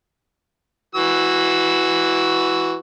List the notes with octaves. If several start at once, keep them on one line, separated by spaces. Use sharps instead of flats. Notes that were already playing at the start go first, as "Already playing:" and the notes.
E3 F#4 E6